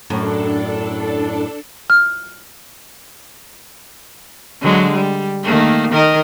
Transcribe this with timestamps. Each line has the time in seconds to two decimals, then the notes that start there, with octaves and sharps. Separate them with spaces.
0.10 F#2 A2 D4 A4
1.90 F6
4.61 D3 F#3 G#3
4.91 G3
5.43 D#3 A3 A#3
5.92 D#3 A#4 D#5